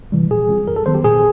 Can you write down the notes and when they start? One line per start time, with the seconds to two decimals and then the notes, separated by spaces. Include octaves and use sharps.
0.12 C3 E3 G3
0.31 A#2 G#4
0.49 G3 C4 F4
0.68 F#2 A#4
0.76 A4
0.86 D#3 F#3 B3 C5
0.95 G4
1.04 A#2 G#4